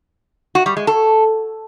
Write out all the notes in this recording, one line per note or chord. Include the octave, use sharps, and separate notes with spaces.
F#4
G3
G#3
A4